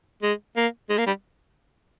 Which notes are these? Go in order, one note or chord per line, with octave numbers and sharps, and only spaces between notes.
G#3
A#3
G#3
A#3
G3